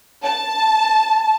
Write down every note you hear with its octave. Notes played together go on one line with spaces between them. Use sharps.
A5